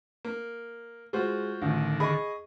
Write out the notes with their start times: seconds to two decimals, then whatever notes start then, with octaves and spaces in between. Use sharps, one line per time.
0.25 A#3
1.13 G#3 F4 F#4 C5
1.62 A1 D3 D#3
2.00 G#4 D#5 B5 C#6